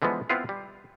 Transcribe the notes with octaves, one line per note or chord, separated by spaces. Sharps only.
D3 E3 F3 G#3 B3
B3 C4 E4 F4 B4 F5
G3